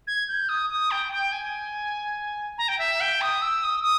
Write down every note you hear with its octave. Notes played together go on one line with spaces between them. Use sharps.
G#6
G6
D#6
D#6
G5
G5
G#5
A#5
G5
E5
G5
D#6
E6
D#6
D#6